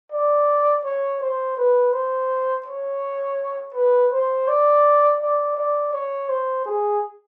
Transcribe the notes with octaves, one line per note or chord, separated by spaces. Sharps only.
D5
C#5
C5
B4
C5
C#5
B4
C5
D5
D5
D5
C#5
C5
G#4